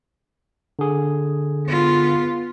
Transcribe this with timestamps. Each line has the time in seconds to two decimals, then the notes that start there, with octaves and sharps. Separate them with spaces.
0.79 D3 G#4
1.67 B3 F4